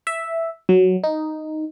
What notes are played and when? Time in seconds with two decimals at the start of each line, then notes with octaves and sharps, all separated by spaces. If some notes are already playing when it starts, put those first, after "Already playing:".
0.07 E5
0.69 F#3
1.04 D#4